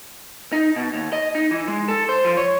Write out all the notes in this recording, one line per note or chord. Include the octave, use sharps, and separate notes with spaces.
D#4
B2
D#2
D#5
D#4
E3
G#3
A4
C5
F3
C#5